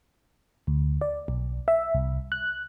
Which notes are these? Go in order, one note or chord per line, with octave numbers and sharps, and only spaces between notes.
D2
D5
B1
E5
C2
F#6